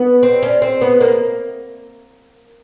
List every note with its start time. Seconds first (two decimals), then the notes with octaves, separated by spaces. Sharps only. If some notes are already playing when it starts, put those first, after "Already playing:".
Already playing: B3
0.23 C4
0.43 C#4
0.62 C4
0.81 B3
1.01 A#3